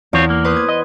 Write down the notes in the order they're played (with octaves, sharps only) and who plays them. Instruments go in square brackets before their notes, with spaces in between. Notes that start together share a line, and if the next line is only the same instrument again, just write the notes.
[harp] E2 [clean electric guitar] C4 F4 C#5
[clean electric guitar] A#3
[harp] B4 C5 D#6
G#6
[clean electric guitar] D#5